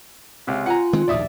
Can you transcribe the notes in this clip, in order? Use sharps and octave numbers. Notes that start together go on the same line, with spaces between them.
C#2 C3
F4 F#5 G#5 A#5
D#3 G#3 C4
A#1 D#2 A2 D5 E5 D#6